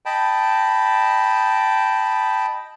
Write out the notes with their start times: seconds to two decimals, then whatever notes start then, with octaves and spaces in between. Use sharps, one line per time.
0.06 D#5 G5 A5 B5